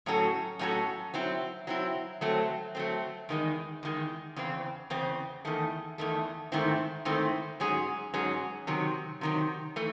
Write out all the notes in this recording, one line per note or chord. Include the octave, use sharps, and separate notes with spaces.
A2 F#3 C#4 F#4 A4
A2 F#3 C#4 F#4 A4
F#3 C4 E4
F#3 C4 E4
F#3 A3 C4
F#3 A3 C4
E2 D#3 G#3
E2 D#3 G#3
E2 C#3 C4
E2 C#3 C4
E2 D#3 A3
E2 D#3 A3
G#2 D#3 A3 C4 E4
G#2 D#3 A3 C4 E4
G#2 F#3 C#4 G#4
G#2 F#3 C#4 G#4
C3 D#3 F#3
C3 D#3 F#3
E3 A3